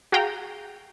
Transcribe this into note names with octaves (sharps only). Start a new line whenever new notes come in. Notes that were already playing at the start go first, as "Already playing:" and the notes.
F#4 G#4 F5 G5 A#5